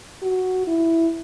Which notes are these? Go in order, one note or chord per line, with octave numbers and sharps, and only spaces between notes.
F#4
E4